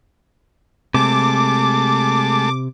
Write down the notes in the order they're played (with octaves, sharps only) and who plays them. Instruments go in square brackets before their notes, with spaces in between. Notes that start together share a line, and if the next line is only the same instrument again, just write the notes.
[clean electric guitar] C3 [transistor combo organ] G#3 A3 A5 [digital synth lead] D6